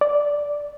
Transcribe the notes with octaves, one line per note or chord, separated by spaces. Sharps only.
D5